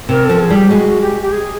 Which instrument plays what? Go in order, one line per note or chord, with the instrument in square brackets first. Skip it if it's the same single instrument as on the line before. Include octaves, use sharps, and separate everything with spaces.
[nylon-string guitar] C3 [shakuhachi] A#4
[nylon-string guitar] F3 [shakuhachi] A4
[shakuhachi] G#4
[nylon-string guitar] G3 [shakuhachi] G4
[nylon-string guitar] G#3 [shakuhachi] F#4
[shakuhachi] G4
G4
G#4